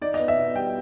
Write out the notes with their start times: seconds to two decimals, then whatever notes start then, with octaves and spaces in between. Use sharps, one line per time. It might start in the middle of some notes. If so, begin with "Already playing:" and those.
0.01 D#4 D5
0.14 D#5
0.19 B3
0.28 E5
0.36 B2
0.55 G3 G5